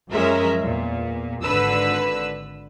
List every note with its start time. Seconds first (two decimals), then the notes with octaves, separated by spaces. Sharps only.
0.11 F#2 F3 G#3 C#4 A#4 E5
0.62 E2 A#2
1.43 G#1 D3 B4 E6